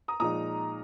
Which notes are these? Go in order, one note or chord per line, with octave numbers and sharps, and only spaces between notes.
A#5 D#6
A#2 F3 G#3 D#4 A#5 D#6